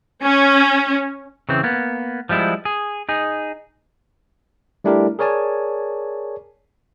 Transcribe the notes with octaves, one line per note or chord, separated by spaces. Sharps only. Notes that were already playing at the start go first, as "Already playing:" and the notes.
C#4
C#3 E3 C4
A#3 B3
F3 G3 G#3 E4
G#4
D#4 G#4
G3 A3 D4 E4 G4 A#4
G#4 A#4 C#5 D5 G#5 A5